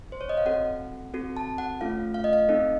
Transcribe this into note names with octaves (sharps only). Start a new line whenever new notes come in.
C5
C#5
D#5
F5
C4 F#4 A4 F#5
C4 F#4 A4
A5
F#5
A3 C#4 F4 A4 F5
F5
D#5
F5
C4 D#4 A4 D#5